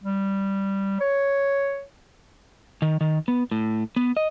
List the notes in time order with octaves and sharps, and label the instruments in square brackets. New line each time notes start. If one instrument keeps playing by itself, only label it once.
[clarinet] G3
C#5
[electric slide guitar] D#3
D#3
B3
A2
B3
D#5